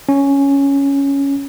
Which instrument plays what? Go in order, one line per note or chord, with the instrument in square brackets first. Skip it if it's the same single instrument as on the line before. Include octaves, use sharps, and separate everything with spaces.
[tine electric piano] C#4